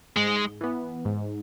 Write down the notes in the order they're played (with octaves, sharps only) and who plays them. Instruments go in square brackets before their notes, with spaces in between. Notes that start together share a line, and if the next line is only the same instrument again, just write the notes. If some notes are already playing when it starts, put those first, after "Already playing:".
[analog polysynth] G#2 [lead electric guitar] G#3
[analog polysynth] E3 B3
G#2